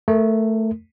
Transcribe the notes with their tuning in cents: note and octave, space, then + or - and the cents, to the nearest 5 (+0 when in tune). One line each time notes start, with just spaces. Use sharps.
A3 +0 A#4 -15